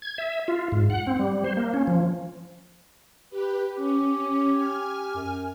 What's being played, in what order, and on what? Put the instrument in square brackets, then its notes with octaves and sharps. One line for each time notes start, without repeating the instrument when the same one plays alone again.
[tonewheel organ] G#6
E5
F4
G#2
F#5
C4
G3
C5
A#3
C#4
F3
[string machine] G4 B4
[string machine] C#4 [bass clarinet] G4
[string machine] G#5 F6
[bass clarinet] F#2